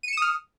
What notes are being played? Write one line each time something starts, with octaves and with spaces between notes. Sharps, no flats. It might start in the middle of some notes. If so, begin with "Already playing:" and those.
D#6 F6 C#7 D#7 E7